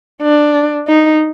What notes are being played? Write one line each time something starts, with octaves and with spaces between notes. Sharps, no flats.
D4
D#4